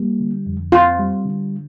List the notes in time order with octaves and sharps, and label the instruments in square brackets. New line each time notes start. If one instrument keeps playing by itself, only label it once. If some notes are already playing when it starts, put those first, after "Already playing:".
Already playing: [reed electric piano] G3 A#3
D3
F2
[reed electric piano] C4 [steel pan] F4
[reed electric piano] G3
D3